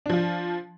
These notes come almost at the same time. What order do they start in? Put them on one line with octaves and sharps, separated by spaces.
D4 F3 F4